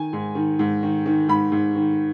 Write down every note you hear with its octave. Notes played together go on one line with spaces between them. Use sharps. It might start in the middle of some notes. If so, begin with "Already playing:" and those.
Already playing: D#3 G#5
G#2
D#3
G#2
D#3
D#3
G#2 B5
G#2
D#3